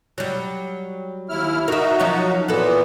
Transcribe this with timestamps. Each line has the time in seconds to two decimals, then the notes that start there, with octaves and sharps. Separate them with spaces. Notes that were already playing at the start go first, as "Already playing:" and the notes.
0.18 F#3 G3
1.29 D#2 E4 F6
1.68 D#4 F#4 A#4 E5
2.00 F3 F#3 C#4
2.48 A#2 E3 B3 F#4 A4